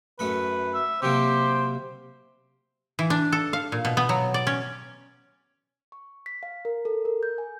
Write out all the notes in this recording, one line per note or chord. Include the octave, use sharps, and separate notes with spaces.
F#2 A3 B4 B5
E5
C3 F#3 A#3 G4 C5
E3
D4
A4
F5
A#2
B2
B3
F#3
D5
C#4
C#6
B6
F5
A#4
A4
A#4
G6
G#5